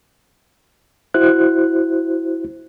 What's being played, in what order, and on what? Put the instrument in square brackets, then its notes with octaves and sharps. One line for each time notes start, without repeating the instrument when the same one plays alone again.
[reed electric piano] E4 F#4 C5 F#6